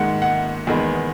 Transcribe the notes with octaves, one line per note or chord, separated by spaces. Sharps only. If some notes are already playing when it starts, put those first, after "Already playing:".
Already playing: G#2 D#3 G#3 F#5
F#5
E2 D#3 G#3 B3